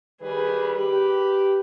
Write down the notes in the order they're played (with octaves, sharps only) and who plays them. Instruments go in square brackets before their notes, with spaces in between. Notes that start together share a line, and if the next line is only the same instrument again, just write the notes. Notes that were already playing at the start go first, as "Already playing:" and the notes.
[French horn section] D#3 G3 B4 [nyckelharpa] G#4
[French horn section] G4 [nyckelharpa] B4